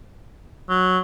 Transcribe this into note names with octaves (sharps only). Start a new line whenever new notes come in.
F#3